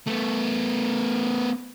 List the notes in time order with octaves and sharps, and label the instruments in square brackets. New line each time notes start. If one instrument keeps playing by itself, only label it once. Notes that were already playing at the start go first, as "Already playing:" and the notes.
[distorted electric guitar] A3 B3